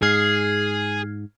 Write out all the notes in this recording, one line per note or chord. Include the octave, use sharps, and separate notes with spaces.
G#2 G#4 F6 G#6 C7